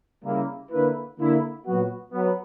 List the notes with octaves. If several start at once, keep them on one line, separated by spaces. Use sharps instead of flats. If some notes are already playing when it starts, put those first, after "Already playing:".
C#3 G3 A#3 E4
D3 A#3 E4 B4
D3 A#3 E4
A#2 F#3 B3 F#4
F#3 B3